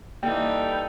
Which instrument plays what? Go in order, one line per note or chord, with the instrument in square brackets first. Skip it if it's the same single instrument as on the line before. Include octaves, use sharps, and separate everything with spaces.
[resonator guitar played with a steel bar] E3 G3 [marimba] A#3 [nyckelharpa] D#4 A4 [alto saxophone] G5